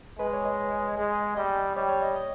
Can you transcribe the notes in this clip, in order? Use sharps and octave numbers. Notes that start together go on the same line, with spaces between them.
G#3 B4
C#5
D#5
G#3
G3 D#5
G3 C#5
C#5
D#5
D#5